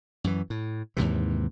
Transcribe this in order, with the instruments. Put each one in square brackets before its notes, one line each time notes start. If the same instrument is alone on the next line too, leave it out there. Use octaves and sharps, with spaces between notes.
[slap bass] F#2 E3
A2
D#2 G#2 C3 E3